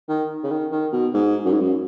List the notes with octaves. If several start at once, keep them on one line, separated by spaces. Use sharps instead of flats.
D#3
C#3
D#3
D#3
B2
G#2
F#2
G#2
F#2